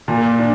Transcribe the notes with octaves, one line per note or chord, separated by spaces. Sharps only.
A#2
D4